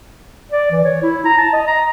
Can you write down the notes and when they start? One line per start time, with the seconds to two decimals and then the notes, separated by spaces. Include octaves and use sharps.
0.52 D5
0.71 E3
0.84 C#5
1.03 E4
1.25 A#5
1.38 A5
1.53 D#5
1.67 A#5